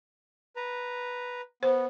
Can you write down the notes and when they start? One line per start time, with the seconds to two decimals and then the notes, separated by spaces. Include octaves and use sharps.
0.56 B4 A#5
1.63 B3 C5